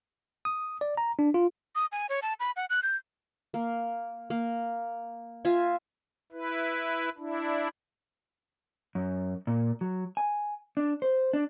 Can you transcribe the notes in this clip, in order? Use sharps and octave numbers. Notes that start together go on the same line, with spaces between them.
D#6
D5
A#5
D4
F4
D#6
G#5
C#5
A5
B5
F#5
F#6
G6
A#3
A#3
F4 E5 G#5
E4 B4
D4 E4
F#2
A#2
F#3
G#5
D4
C5
D4